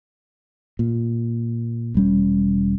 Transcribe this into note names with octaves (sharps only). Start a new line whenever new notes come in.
A#2
E1 G3 C#4